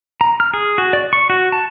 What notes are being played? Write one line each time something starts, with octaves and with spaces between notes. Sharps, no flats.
A#5
F6
G#4
F#4
D5
C#6
F#4
A5